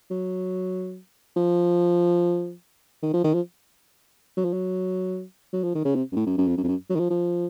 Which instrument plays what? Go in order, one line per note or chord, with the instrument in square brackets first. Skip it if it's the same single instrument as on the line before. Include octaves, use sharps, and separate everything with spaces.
[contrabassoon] F#3
F3
D#3
F3
D#3
F3
F#3
F3
F#3
F#3
F3
D#3
C#3
C3
F#2
A2
F#2
F#2
F2
F#2
F2
F#2
F#3
D#3
F3
F3